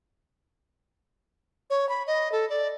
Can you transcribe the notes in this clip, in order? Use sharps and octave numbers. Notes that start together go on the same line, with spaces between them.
C#5
B5
D#5
A4
D5